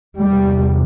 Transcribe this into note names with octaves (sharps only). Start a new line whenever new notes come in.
E2 C3 G3